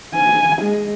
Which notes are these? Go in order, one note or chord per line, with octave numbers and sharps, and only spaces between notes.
G#5
G#3